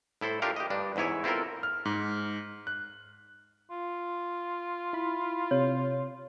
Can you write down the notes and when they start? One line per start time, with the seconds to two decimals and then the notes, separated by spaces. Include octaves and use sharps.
0.21 A2 E4 A4 C5
0.42 A3 D4 F4 G4 A#4 F5
0.56 G4 D#5
0.70 G2 D4
0.96 E2 G#2 E4 C#5 G#5
1.24 C4 E4 F4 A4 A#4
1.63 F6
1.85 G#2
2.67 F#6
3.70 F4
4.93 E4 B5
5.51 C3 C#5